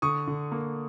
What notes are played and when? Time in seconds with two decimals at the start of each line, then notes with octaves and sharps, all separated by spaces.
0.02 D3 C#6 D#6
0.27 D3
0.52 A#3